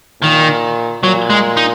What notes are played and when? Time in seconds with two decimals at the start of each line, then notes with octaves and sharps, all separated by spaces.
0.22 A#2 D#3
1.03 A#2 F#3
1.30 G#3
1.57 D#4